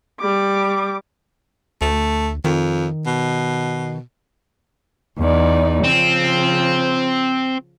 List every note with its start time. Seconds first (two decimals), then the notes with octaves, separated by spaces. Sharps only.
0.20 G3 D6
1.82 D2 A3
2.45 F2 D#3
3.06 B2
5.18 E2 D#4 D5
5.84 C#3 F3 C4